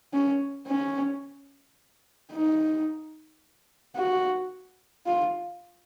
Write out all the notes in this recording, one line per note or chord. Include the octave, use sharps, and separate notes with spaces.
C#4
C#4
D#4
F#4
F4